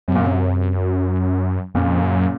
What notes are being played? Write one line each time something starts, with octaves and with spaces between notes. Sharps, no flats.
F#2 C3
A#2
C3
F2 A#2 C#3
F#2